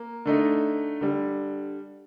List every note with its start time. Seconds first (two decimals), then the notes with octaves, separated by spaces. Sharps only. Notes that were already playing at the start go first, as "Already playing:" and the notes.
Already playing: A#3
0.26 D3 A3 D#4
1.01 D3 G3